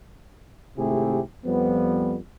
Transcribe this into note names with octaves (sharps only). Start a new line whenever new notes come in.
G#1 C3 A3 E4 G4 G#4
F2 F3 G3 B3